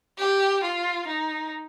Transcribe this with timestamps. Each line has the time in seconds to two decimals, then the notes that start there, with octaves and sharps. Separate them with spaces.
0.19 G4
0.64 F4
1.09 D#4